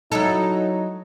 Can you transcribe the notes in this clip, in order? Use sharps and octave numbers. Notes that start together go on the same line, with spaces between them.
F#3 D#4 E4 A4